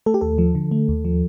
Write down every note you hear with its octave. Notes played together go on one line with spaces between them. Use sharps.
A3 A4
G4
D#2 A4
F3
D3
A3
D#2
F3